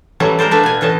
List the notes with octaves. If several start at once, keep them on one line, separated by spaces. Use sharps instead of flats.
E3 F#3 G3 A3 C#4
G#3 A#4 C5 D5
A3 D4 B4 E5 F5
B2 G#5
A2 E3 C#4 D#5 A5